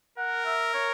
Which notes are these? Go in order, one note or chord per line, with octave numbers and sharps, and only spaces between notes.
A#4 F#5
E5
C#5